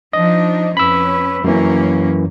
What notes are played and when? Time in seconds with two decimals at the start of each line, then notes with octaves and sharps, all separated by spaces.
0.13 F3 D4 D#4 D#5
0.77 F2 C#4 B4 B5 E6
1.44 F#2 E3 A#3 C#4